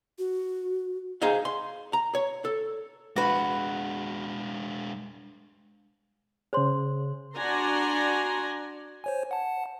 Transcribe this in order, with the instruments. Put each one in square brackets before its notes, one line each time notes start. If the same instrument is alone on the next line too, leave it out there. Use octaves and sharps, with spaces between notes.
[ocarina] F#4
[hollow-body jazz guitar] D#4 G#4 C5 D#5 F5
C6
A#5
C#5
A4
[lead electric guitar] G#3 D4 [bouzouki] F#4 B4
[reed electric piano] C#3 G#4 [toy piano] C5 C#5 C6
[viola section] D4 F#4 D5 G#5 A#5 C6
[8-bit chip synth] C5 C#5 G#5
F#5 A5